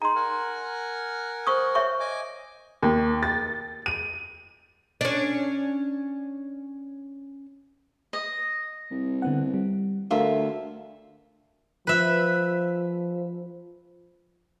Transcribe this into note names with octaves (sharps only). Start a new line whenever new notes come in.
D#4 G#4 A#5 C6
A#4 F#5 G#5
C5 C#6 D#6
C#5 E5 C#6
D#5 G#5 D6
D#2
A6
D#7
C#4 D4
D#5
C2
D3 B3 F#5
G3
D2 F4 F#4 A4 A#4 E5
F3 B4 E5